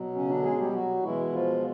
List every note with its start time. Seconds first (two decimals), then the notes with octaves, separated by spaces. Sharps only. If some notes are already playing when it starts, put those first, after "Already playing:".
Already playing: B2 F#3
0.15 C#3 C#4
0.29 D3 D4
0.44 G#3 G#4
0.58 G3 G4
0.73 F#3 F#4
1.03 B2 E3 G#3 E4
1.32 F3 F4